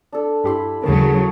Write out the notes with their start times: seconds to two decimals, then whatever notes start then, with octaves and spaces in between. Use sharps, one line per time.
0.12 D4 A4
0.44 G2 E4 G4 B5 C6
0.84 D#2 C#3 F#3 A#4 A5 C#6